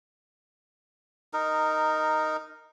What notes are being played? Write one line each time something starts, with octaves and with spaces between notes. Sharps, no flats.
D#4 A#4